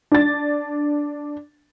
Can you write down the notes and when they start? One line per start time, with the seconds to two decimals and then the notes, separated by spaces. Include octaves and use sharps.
0.12 D4 A6